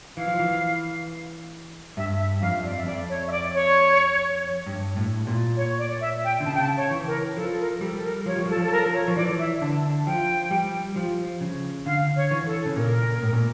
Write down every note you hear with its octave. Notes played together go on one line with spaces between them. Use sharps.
E3 F5
F3
E3
G2 E5
E5
F2 F5
D5
E5
F2 D5
C#5
E5
D5
C#5
G2
A2
A#2
C#5
D5
E5
G5
D3
C#3 A5
G5
A5
C#5
E3
A#4
F3 A4
A#4
G3 A4
A#4
F3 C#5
G3
F3
A4
F3
A4
A#4
F3
C#5
F3
E3 D5
E5
D3 A5
A5
F3 G5
G3
F3
C#3
D3 F5
C#5
E3
A4
C#3
A#2 A#4
A2
A#2